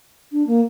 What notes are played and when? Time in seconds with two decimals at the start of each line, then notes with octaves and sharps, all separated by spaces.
0.32 D4
0.47 A#3